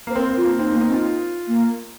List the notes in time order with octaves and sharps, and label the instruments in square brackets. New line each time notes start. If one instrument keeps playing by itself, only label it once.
[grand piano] A#3
[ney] C5
[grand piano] C4 [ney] A#4
[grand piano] C4
[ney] F4
[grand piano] A#3
[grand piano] C4 [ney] D#4
[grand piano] D#4
[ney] A#3
[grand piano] D#4
[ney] C4
[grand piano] F4
[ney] A#3